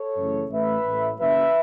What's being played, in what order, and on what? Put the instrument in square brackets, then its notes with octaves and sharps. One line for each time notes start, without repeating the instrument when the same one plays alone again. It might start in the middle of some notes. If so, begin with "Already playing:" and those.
Already playing: [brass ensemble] A4 C#5
F#2 C#3 E3 A3
A1 A2 A3 B4 E5
A1 A2 A3
F#1 F#2 F#3 B4 E5